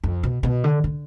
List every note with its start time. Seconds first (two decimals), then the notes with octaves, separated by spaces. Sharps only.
0.04 F2
0.23 B2
0.43 B2
0.64 D3
0.84 D3